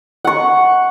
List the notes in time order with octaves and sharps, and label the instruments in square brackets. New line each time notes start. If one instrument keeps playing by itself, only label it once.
[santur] F#5 C#6